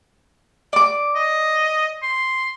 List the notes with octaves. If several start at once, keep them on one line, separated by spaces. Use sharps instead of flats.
D5 D6
D#5
C6